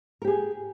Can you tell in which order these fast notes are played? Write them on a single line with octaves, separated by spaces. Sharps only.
A#4 G4 G#4